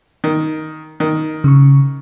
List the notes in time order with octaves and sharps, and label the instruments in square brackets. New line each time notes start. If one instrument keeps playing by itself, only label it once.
[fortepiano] D#3
D#3
[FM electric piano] C#3 C#6